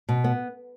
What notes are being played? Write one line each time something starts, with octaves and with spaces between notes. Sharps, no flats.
B2
B3